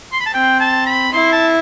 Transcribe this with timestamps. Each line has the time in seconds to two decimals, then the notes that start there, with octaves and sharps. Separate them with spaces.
0.12 C6
0.20 B5
0.26 A5
0.34 C4 G5
0.60 A5
0.86 B5
1.12 E4 C6
1.32 A5